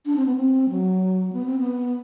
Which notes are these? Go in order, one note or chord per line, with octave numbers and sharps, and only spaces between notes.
D4
C4
B3
C4
F#3
B3
C4
B3